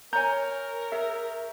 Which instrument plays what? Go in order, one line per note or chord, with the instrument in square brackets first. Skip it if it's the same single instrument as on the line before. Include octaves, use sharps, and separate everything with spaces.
[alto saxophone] A#4 [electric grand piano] C#5 G6 [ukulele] G#5 A#5
[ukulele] G#4 [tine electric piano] E5